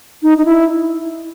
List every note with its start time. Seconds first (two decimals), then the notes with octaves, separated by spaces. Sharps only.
0.23 D#4
0.38 D#4
0.45 E4